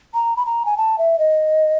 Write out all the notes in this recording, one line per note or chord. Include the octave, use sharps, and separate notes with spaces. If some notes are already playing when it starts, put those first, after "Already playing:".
A#5
B5
A#5
G#5
A5
E5
D#5